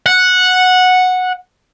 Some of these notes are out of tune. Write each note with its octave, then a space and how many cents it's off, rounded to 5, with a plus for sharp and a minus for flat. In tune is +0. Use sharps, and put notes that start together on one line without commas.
F#5 -10